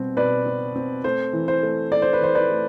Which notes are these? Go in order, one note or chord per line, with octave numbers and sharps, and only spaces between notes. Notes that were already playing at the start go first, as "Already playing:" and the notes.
Already playing: B2 G3 C4
B2 B4 D5
C4
C4
A3 C5
E3
C5
A3
A3 D5
C5
B4
E3 C5
B4 D5
A3